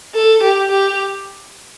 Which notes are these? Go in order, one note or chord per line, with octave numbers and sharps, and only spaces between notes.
A4
G4
G4